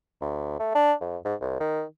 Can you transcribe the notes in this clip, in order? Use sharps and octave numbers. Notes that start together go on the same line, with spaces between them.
D2
A3
D4
F2
G#2
C2
D#3